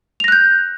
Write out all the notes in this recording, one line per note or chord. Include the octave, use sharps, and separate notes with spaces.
F#6 G6 A#6 F7